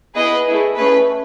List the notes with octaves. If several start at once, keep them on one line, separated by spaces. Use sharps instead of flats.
B3 E4 G#4 B4 D#5
A3 E4 G#4
A3 C#4 G#4 B4